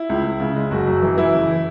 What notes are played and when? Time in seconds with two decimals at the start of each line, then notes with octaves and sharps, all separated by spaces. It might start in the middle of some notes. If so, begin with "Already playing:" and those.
Already playing: E4
0.09 C#2
0.24 C#2
0.40 C#3
0.56 G#3
0.71 F#1 F#4
0.86 F#2
1.02 E3
1.17 E3 E4
1.34 F#1